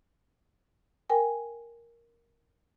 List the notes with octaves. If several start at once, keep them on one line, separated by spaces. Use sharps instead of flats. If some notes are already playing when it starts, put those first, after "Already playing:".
A#4 G5 G#5